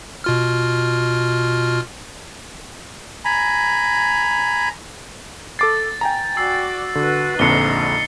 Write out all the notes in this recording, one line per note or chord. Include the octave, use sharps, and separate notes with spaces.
B2 F4 F6
G#5 A#5 B5
A4 D6 A6 C7
G5 G#5 A#5
F#4 D5 E6 A6 C7
D3 F#4 B4
A#1 F2 D3 D#4 C7 C#7 G7